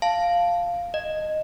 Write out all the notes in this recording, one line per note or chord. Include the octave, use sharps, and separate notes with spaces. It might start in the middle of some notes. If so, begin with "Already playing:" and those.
F5 A5
D#5